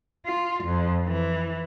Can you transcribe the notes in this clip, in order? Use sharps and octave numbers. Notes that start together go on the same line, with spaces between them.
F4
F2
E3